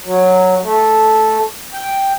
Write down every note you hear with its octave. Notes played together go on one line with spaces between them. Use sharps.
F#3
A3
G5